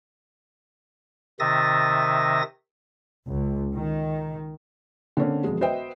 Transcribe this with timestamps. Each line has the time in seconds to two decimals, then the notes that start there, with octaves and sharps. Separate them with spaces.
1.40 C3 D#3 E5 D#6 A6 A#6
3.27 C#2
3.77 D#3
5.17 D3 A#3 C4 C#4
5.44 E1 F2 G#3
5.61 F#4 B4 C5 D#5 E5 G5